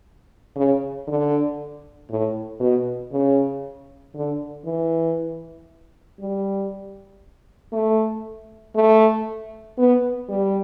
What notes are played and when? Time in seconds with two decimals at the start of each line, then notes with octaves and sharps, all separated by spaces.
0.56 C#3
1.08 D3
2.10 A2
2.60 B2
3.12 C#3
4.15 D3
4.66 E3
6.20 G3
7.73 A3
8.76 A3
9.78 B3
10.29 G3